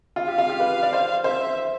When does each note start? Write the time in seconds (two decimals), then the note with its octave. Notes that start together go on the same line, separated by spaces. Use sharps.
0.16 F4
0.28 G4 F5
0.38 F4
0.49 G4
0.60 B4
0.82 D5
0.93 C5
1.24 C5 E5